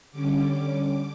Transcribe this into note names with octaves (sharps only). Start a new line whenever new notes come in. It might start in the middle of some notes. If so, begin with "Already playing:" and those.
D3 G3 C#4 D6